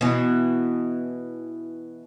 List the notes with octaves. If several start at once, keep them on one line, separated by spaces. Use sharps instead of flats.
B2 E3